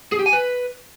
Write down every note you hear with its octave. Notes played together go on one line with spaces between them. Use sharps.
G#4
G4
G#5
B4